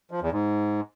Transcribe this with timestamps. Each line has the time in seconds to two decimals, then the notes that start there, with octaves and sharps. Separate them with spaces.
0.11 F3
0.22 E2
0.32 G#2